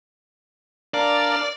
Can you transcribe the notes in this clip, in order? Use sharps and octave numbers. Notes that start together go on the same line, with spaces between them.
D4 A#4 D5 F5